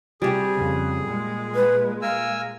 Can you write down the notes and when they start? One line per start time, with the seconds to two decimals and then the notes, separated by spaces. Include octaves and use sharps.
0.22 C3 G3 G4 G#4
0.57 F2 C#3
1.05 A#2 G#3
1.55 B4
2.02 A#4 F5 G#5 E6